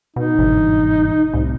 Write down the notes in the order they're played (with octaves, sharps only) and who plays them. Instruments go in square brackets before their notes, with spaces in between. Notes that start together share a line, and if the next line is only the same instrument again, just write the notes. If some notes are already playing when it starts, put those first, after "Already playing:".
[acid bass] B2 [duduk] D#4
[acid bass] G1 [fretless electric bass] G#2 B2 E3
[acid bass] C2 [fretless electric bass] A2